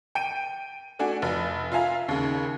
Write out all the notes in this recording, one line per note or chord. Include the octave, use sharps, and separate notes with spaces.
G5 D7 D#7
A3 D4 F#4 G#5
F1
F4 E5 F5 G#5 A#5
D#2 C#3